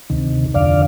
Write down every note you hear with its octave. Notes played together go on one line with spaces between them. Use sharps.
D2 C3 D#3
F2 D3 D5 F5